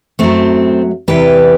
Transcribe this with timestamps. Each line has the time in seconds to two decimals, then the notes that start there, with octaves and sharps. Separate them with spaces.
0.19 F#2 F#3 A3 C4
1.08 E2 C3 E3 G3 G4 B4